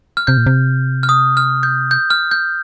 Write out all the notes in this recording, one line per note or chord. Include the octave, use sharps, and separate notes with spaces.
F6
C3 G6
A#2
C3
F6
D#6
F6
G6
G6
F6
G6